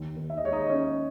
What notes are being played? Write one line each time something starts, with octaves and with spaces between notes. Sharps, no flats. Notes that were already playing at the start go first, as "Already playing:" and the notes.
Already playing: D#2
D#2
E5
D#5
G#3 C#5
D#4 D#5
G#3 C#4 C#5